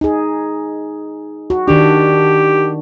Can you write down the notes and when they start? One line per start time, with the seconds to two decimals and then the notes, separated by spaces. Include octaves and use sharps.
0.01 D#4 G#4
1.50 F#4
1.68 D#3 D4 G4